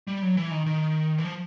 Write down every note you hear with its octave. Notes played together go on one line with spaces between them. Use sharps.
G3
F#3
E3
D#3
D#3
E3
F3